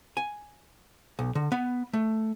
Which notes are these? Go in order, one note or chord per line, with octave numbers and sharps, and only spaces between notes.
G#5
B1
D3
B3
A3